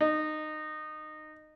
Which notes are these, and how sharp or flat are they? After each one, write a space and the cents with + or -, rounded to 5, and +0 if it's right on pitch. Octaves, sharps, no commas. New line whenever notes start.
D#4 -20